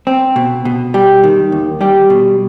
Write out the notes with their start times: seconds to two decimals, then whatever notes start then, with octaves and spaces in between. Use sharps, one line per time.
0.07 C4
0.36 B2
0.65 B2
0.94 G3 G4
1.24 D#3
1.52 D#2
1.81 G3 G4
2.10 B2